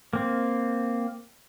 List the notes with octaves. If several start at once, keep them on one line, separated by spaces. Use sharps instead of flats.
A#3 C4